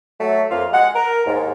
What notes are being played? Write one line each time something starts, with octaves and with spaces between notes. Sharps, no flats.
F#3 A3
F2 A#3 F4
G#3 F#5
A#4
D#2 G#2